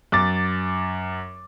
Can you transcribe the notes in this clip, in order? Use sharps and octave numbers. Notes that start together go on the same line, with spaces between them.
F#2 D6 A6